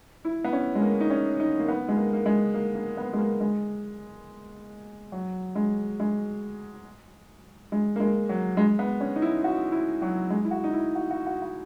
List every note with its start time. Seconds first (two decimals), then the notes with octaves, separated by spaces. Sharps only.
0.25 E4
0.44 B3
0.53 C#4
0.75 G#3
0.82 A#3
1.01 D#4
1.10 C#4
1.40 D#4
1.59 A#3
1.69 B3
1.88 G#3
1.97 A#3
2.13 A#3
2.26 G#3
2.54 A#3
2.75 A#3
2.97 B3
3.13 G#3
3.19 A#3
3.40 G#3
5.12 F#3
5.55 G#3
6.00 G#3
7.72 G#3
7.96 A#3
8.00 G#3
8.29 F#3
8.57 G#3
8.79 B3
9.00 C#4
9.16 D#4
9.22 E4
9.44 F#4
9.72 E4
10.02 F#3
10.30 G#3
10.44 E4
10.51 F#4
10.64 D#4
10.73 E4
10.95 F#4
11.11 F#4
11.27 F#4
11.42 F#4